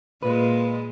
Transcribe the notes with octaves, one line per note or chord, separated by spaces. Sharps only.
A#2 G#3 B4